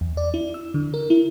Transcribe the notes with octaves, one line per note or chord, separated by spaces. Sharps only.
E2
D5
E4
E6
D3
A#4
E4